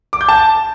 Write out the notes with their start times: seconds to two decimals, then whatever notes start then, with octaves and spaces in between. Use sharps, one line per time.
0.13 D6
0.21 G6
0.29 A5